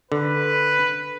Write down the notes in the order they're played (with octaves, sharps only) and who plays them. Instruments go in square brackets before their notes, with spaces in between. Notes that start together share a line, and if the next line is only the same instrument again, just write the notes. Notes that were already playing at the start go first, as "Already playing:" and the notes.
[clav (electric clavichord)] D3 [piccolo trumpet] B4